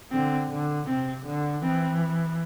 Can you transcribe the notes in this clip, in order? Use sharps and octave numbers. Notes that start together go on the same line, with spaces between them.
D3 C4
D3
C3 C4
D3
E3 C4